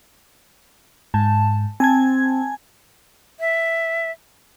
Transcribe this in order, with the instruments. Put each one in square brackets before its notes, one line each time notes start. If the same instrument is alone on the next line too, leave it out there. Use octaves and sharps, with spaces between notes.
[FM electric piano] G#2 [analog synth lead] A5
[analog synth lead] C4 [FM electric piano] G#5 A5 G#6
[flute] E5